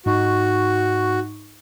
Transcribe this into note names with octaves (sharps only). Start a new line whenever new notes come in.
G#2 D#4 F#4 C#6